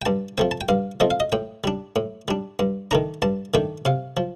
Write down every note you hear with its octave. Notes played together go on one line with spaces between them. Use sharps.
G5
G2 A5
F3 A3 C4 G5
A5
G5
G2 F5
F3 A3 C4 D#5
F5
D#5
A2 G5
G3 D4
A2
G3 D4
G2
D#3 A3 D4 A#5
G2 A5
D#3 A3 D4 G5
C3 F5
F3